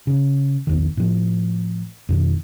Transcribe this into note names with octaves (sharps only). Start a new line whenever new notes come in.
C#3
A#1 E2 D#3
A2 F3
F2 B2 D#3